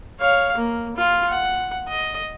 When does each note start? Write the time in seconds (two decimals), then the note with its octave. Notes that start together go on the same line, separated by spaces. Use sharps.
0.21 C#5 F5
0.57 A#3
0.97 F4
1.29 F#5
1.88 D#5